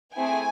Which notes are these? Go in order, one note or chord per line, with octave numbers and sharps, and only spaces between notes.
A3 C4 E4 G#4 G#5